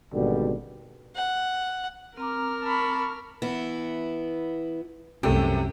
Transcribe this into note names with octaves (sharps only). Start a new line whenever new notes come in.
G#1 B2 D3 G3
F#5
C4 A#4 A#5 D6 F6
A5 B5 C#6
E3 B3 E4
C2 F#2 C3 A3 G4